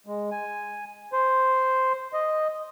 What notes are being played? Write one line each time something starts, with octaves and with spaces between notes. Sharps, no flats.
G#3
G#5
C5
D#5